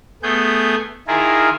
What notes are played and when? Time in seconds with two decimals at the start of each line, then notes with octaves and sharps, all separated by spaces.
0.23 A3 B3 G#4 G6
1.07 D#3 E4 F4 G#4 A#4